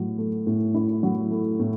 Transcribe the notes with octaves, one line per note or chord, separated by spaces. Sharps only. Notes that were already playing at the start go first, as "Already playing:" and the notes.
Already playing: A2 F#3
A3
A2
E4
F#3
A3
A2